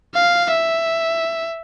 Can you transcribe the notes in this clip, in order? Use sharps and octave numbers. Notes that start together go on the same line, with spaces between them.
F5
E5